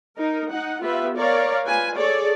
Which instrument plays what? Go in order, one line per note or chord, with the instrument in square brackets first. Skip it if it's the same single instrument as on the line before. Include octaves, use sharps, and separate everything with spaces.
[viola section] D#4 A#4
D#4 F#5
B3 F4 G4 B4 E5
A#4 C#5 D5 F5
F4 B4 G#5
G#4 A4 C#5 D5